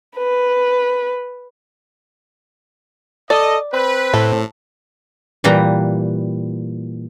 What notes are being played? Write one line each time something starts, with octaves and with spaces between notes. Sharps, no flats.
B4
A4 D5 D#5
C4 B4
A2 A4
A#2 E3 G3 B4 G5 A#5